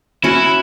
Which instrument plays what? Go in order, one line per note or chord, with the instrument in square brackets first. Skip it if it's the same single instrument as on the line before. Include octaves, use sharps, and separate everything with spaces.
[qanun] C#4 F#4 [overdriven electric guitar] E4